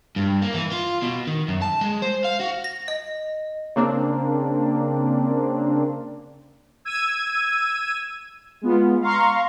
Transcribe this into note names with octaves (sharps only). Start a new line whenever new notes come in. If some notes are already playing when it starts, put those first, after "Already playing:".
G2
A#3
E3
F4
B2
D#3
F#2
A5
G#3
C5
F5
F#4
A#6
D#5
C#3 A#3 C4 D4
E6 G#6 D#7
G#3 B3 F4
F5 A#5 C6 C#6